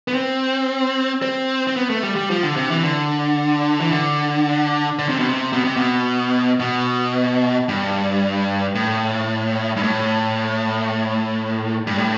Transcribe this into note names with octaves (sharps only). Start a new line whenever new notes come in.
B3
C4
C4
C4
B3
A3
G3
G3
F3
D3
C3
E3
D3
E3
D3
D3
C3
B2
C3
B2
C3
B2
B2
G2
A2
G2
A2
G2
A2